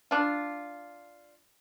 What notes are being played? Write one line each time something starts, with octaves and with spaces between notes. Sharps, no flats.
D4 F4